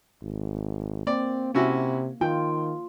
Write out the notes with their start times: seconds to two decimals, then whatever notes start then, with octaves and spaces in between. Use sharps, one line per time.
0.22 G#1
1.07 A#3 C4 D5
1.55 C3 C#4 E4 F#4
2.21 D#3 F4 G5